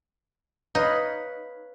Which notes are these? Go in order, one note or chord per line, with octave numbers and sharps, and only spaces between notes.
D#4 B4 C#5 F5